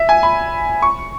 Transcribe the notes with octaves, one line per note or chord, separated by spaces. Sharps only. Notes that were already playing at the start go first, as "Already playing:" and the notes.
Already playing: E5
G#5
B5
C#6